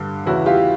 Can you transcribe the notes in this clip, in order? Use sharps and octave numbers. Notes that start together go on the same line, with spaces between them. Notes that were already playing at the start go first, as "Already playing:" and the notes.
Already playing: G2 D3
E2 C#3 E3 E4 F#4
F4 G4